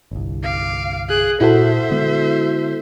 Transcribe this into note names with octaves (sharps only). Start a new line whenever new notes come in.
G1 C2
F5 D6
G#4 F#6
A#2 E4 F#4 A4 C5 E5
D3 G#3 B3